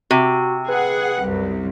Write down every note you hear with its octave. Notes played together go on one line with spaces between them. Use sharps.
C3 F#4
G#4 B4 F#5
C2 F#2